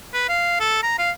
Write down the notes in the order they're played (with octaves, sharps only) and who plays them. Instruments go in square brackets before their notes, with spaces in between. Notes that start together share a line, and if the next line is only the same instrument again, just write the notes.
[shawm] B4
F5
A4
A#5
F5